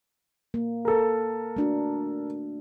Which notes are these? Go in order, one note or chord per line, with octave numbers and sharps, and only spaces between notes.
A#3
A4 A#4
A3 D4 F#4